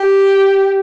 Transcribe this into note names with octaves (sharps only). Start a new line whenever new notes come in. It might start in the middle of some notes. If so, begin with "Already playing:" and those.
Already playing: G4